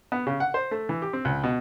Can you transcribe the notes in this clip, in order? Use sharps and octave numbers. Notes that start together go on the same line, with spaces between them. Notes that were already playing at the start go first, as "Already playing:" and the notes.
B3
C#3
F#5
C5
A3
E3
G4
C4
C#2
B2